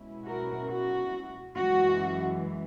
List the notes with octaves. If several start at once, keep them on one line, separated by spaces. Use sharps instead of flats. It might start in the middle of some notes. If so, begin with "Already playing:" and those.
Already playing: B2 G#3 C#4 E4
F#4 A#4
F#4
F#2 E3 G#3 F#4